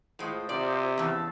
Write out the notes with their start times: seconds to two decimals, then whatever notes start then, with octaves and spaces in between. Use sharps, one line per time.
0.19 A2 G#3 F4 C5 D#6
0.49 C3 D5
0.98 E2 C#3 A5 E6